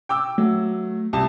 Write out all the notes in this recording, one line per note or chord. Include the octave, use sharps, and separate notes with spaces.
G5 D6 E6
F#3 A3
C2 A5